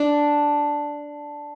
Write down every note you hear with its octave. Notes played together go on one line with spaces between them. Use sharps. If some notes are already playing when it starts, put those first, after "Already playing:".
Already playing: D4